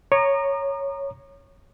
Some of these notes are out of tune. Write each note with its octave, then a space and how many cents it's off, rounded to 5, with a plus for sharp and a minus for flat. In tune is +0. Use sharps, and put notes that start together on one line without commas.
C#5 +0 A#5 +0 D#6 -45